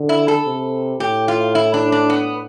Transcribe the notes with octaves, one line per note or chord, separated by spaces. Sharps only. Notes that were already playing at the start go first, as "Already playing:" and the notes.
Already playing: D3
E4
A4
C3
A2 G4
F4
E4
D4
D4
B3